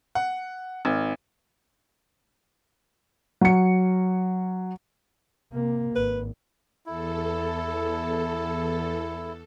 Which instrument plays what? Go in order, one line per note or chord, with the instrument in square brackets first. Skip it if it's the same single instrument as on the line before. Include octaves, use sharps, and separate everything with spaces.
[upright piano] F#5
G#1
[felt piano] F#3 C#7
[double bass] C3 A#3
[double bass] G#1 [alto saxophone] B4
[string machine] E2 A4 [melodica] E4